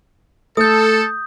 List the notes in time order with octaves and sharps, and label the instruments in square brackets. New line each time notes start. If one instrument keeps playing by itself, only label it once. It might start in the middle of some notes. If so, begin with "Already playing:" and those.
[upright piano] A3 [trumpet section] A4 [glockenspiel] D#6 G6